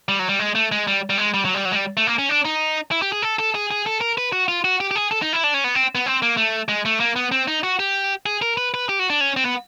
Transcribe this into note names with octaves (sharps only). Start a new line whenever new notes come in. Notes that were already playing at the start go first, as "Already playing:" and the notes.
G3
F#3
G3
G#3
A3
G#3
G3
G3
G#3
G3
F#3
G3
F#3
G#3
G3
A3
A#3
C#4
D4
D#4
E4
G4
G#4
A4
A4
G#4
G#4
A4
A#4
B4
F#4
F4
F#4
G4
G4
G#4
A4
D#4
E4
D4
C#4
B3
C4
B3
C4
A#3
A3
G#3
A3
A#3
B3
C4
D#4
F#4
G4
G#4
A#4
B4
B4
G4
F#4
D4
C#4
C4
B3